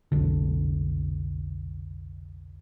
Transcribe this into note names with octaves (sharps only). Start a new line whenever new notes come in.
F1 B1 D3